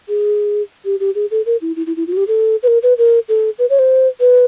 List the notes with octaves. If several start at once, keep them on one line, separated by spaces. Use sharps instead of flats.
G#4
G4
G4
G#4
A4
A#4
E4
E4
E4
E4
F4
F#4
G4
A4
B4
A#4
B4
A#4
A4
B4
C#5
C5
B4